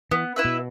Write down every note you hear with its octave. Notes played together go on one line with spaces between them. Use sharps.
E3 B3
E4 B4 E5
B2